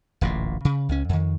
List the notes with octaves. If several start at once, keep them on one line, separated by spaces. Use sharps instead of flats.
D1 A1 A#2
C#3
C#2 C#4
F2 D#3